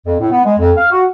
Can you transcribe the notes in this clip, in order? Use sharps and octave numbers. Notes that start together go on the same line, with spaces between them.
F2
A2
B3
G#3
F2
F5
F#4